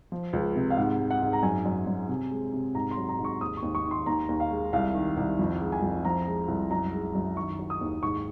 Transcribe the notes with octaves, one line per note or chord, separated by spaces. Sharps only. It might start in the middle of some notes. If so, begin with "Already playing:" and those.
F3
C#2
C3
F5
G#2 F#5
G#3
F#5
G#2
A#5
F#2 G#5
F#2
F#2
C3
G#3
C3
G#2 A#5
C6
F#3
A#5
G#2
C#6
D#2 D#6
C#6
D#2
C#6
D#3
C6
D#2 A#5
D#2
F5
G#3
C2 F5
D#3
C2
F2
G#3
G#5
F2
F3 A#5
G#3
C2
F#2 A#5
G#3
F#2
D#3 C#6
F#3
D#6
D#2
G#2 C#6